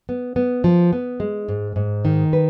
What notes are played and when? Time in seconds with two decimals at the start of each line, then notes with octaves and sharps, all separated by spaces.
0.09 B3
0.36 B3
0.64 F3
0.93 B3
1.20 G#3
1.48 G#2
1.76 G#2
2.05 D#3
2.33 B4